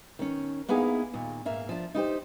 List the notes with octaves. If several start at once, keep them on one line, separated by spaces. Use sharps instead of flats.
D#3 C#4
A#3 B3 D#4 E4 G#4 F5
D#2 A#2
G#2 A#3 E5 F5
F3 D4
D#4 E4 G4 C5